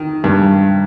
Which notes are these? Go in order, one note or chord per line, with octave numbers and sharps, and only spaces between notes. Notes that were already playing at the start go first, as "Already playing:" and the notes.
Already playing: D#3
G2